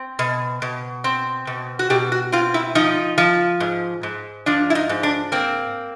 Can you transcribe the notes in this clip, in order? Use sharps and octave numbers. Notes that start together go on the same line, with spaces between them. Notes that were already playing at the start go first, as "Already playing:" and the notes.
Already playing: C4
B2
B2
C4
B2
F#4
B2 G4
F#4
C4 F4
E4
F3 D#4
F3
G#2
G#2
F3 D4
E4
D#4
G#2
D4
A#3 C4